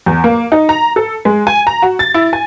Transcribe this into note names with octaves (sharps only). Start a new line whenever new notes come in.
E2
A#3
D#4
A#5
A4
G#3
G#5
A#5
F#4
A6
E4
G#5